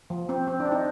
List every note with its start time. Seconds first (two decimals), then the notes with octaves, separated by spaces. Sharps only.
0.10 F3
0.29 C4
0.47 C4
0.60 D4
0.65 C4
0.72 D#4